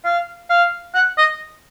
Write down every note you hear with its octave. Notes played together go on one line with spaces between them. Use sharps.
F5
F5
F#5
D#5